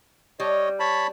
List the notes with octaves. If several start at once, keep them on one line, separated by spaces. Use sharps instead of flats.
G3 C#5 D#5
C#5 A5 B5